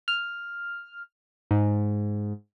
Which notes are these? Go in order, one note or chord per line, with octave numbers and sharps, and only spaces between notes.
F6
G#2